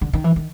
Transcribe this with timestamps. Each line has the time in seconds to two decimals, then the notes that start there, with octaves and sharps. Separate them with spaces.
0.01 D3
0.13 D#3
0.24 E3
0.36 D#3